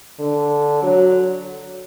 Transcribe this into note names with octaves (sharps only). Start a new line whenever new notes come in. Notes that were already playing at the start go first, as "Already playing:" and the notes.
D3
F#3